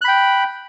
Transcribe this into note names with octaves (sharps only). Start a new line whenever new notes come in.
G5 B5 F#6